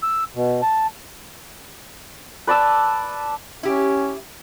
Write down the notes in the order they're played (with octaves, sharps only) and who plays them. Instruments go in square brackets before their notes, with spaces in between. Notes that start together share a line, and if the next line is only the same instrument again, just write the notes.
[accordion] E6
B2
A5
[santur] B4 D5 A5 E6
[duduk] C#4 [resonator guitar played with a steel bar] E4 G4